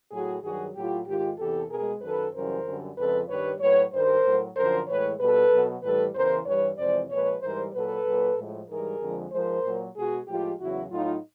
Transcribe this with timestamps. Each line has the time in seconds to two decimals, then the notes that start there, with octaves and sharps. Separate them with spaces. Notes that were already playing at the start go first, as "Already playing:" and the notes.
0.11 A2 F#3 F#4 G#4
0.43 G2 D#3 F#3 F#4 G#4
0.75 A2 F#3 F4 G4
1.06 G#2 D#3 G#3 F4 G4
1.38 E2 C3 E3 G4 A4
1.70 B2 G#3 G#4 A#4
2.02 F#2 D#3 F#3 A4 B4
2.34 F#2 C#3 E3 G3 A#4 C5
2.65 F#2 D3 G3
2.97 F2 C#3 F3 G#3 A4 B4
3.29 G2 D#3 G3 B4 C#5
3.60 A2 F#3 B4 C#5
3.92 G2 D#3 G3 A#4 C5
4.24 A2 F#3
4.56 F#2 D3 F3 A#4 C5
4.87 A2 E3 G#3 B4 C#5
5.19 B2 G3 A4 B4
5.52 B2 F#3
5.82 A2 E3 G3 A4 B4
6.14 E2 C#3 E3 A#4 C5
6.46 G2 E3 G3 B4 C#5
6.78 F2 C3 E3 G#3 C5 D5
7.09 A#2 F3 G#3 B4 C#5
7.41 G#2 E3 G3 A#4 C5
7.73 A#2 F#3 A4 B4
8.05 A#2 F#3
8.37 A2 F3 G#3
8.68 G#2 E3 G3 G#4 A#4
9.00 F2 D3 F3 G#3
9.32 G#2 F3 G#3 A#4 C5
9.64 A#2 F#3
9.96 B2 G#3 F#4 G#4
10.27 A2 F3 G#3 F4 G4
10.59 E2 C#3 F#3 E4 F#4
10.90 A2 F#3 D#4 F4